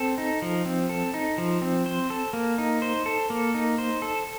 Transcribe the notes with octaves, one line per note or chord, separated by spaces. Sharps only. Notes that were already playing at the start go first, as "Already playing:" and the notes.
Already playing: C4 A4
D#4
F3
C4
A4
D#4
F3
C4
C5
A4
A#3
D#4
C5
A4
A#3
D#4
C5
A4